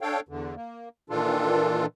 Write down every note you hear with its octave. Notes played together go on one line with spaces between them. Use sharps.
D4 A4 C#5 F5 G5
E2 D3
A#3
A#2 D#3 E3 D4 F4 A4